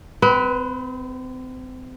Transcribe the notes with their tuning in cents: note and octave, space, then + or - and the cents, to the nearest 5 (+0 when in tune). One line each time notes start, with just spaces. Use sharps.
C4 -35 B4 +0